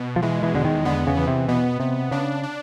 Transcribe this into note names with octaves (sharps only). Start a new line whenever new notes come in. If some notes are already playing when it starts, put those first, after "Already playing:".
Already playing: B2
F3
E3 G#3
E3
E2 D3
D#3
D3 B3
C#3
E3
C3
B2 B3
C3 B3
C#3 D4
D4